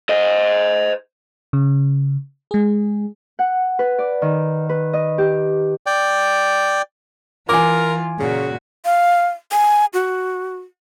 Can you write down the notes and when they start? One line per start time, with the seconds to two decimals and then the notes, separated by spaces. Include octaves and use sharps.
0.09 C5 D#5
1.53 C#3
2.51 G#3 G#4
3.39 F#5
3.79 B4
3.98 D5
4.22 D#3
4.69 B4
4.93 D#5
5.18 G4
5.86 D5 G5
7.49 E3 F4 A#4 G#5 D6
8.20 A#2 C#3 F#4
8.85 F5
9.52 G#5
9.94 F#4